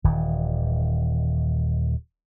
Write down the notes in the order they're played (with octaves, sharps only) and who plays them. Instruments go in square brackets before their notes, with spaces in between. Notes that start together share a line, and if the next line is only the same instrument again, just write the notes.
[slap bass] D#1 D#3 E3